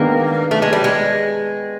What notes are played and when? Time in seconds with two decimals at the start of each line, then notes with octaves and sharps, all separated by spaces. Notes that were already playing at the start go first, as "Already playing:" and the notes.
Already playing: D#3 G#3 A#3 B3 D4
0.51 A3
0.62 G#3
0.73 G3
0.84 G#3